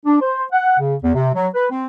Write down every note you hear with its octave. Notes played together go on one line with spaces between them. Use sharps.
D4
C5
F#5
C#3
E2
C3
F#3
B4
C4